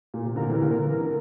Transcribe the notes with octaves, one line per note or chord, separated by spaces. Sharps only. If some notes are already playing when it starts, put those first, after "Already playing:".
A#2
C3
A#2 D3 A#4
C3 E3 A#4
A#2 D3
A#4
E3
D3